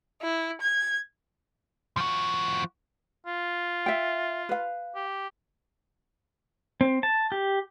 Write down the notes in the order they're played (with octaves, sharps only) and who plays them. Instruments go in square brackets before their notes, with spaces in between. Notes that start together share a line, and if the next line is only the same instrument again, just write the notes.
[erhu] E4
G#6
[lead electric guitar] F3 F#4
[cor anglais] F4
[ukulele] E5 G5
B4 F5
[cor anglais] G4
[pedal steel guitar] C4
A5
G4